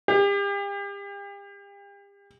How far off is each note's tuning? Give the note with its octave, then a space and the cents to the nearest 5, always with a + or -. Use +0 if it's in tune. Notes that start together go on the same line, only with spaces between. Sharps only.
G4 +40